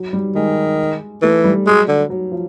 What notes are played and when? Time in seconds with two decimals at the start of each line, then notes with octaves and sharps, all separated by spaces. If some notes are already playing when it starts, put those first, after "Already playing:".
Already playing: F#3
0.13 G3
0.35 D#3 G#3
1.22 E3 A3
1.44 G3
1.66 F#3 G#3
1.88 D3
2.10 F#3
2.32 F3